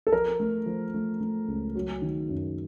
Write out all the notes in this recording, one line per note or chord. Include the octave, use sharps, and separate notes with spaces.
A4
F3 A#4
A3
F3
A3
A3
C#2
F#3
D#3
F#2